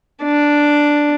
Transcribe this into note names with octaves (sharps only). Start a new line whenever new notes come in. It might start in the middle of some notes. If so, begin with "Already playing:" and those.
D4